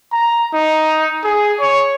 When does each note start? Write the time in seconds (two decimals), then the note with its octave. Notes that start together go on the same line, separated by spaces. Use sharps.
0.12 A#5
0.53 D#4
1.24 G#4
1.60 C#5